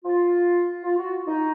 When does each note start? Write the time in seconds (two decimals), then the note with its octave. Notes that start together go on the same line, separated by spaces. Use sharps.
0.04 F4
0.81 F4
0.97 F#4
1.27 D#4